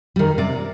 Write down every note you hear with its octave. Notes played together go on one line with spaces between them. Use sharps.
D#3 G3
C3 D5